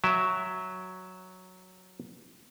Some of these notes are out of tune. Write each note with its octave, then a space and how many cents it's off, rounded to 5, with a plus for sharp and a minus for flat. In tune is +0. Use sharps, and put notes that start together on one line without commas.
F#3 +0 E5 +0 G5 -20